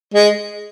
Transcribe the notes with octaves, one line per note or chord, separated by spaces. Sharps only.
G#3